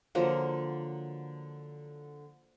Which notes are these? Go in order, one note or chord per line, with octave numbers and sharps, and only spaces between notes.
D3 F3 F#3 A#3